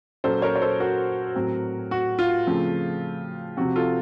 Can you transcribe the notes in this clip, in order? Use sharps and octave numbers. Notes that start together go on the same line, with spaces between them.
A#2 F#3 A#3 C#4 A4 C5
A#4 C#5
C#5
A4 C5
F#4 A#4
A2 F#3 A3 C4
F#4
F4
C#3 F3 A3 C4
C3 F3 C4 F#4
F4 A4